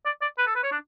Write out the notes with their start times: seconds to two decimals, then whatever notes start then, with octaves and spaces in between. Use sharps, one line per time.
0.05 D5
0.22 D5
0.38 B4
0.47 A4
0.55 B4
0.63 C#5
0.72 D4